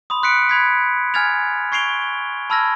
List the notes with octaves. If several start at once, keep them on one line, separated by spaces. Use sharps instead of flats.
B5 C6 D#6
C6 F#6 B6 C#7 D7
B5 G#6 B6
G#5 F6 G#6 A6 F7
C#6 G#6 C7 D7 F7 G7
A5 B5 E6 F6 G#6 A#6